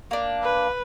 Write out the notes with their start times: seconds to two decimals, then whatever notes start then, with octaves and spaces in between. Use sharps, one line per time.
0.11 A#3 D4
0.43 B4